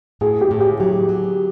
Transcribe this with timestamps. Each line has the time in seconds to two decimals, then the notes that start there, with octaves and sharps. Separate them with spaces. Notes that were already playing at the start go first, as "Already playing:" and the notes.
0.21 A2 G#4
0.41 G4
0.51 A2
0.60 G4
0.80 F#3 G4
1.09 F#3